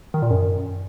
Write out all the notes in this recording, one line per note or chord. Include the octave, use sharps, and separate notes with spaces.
D#3
A#2
F#2